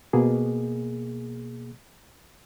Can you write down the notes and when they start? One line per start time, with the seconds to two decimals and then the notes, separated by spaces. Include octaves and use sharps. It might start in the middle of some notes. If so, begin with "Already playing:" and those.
0.13 B2 A#3 G#4